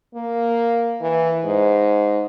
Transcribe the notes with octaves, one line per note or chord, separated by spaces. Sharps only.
A#3
E3
G#2